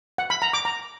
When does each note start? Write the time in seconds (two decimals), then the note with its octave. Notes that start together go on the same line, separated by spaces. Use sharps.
0.18 F#5
0.30 B5
0.42 A#5
0.53 D6
0.65 A#5